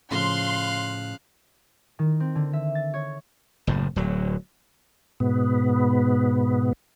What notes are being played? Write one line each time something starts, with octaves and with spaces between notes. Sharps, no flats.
A2 C#3 F3 F5 C6 F#6
D#3
C4
D3
E5
A6
C#5
F#1 A2
D1 F#3
G#2 B2 B3